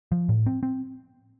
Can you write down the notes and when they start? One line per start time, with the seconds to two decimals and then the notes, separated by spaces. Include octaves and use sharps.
0.12 F3
0.29 A2
0.46 C4
0.63 C4